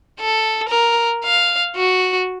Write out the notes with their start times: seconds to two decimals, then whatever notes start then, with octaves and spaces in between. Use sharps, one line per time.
0.21 A4
0.69 A#4
1.24 F5
1.76 F#4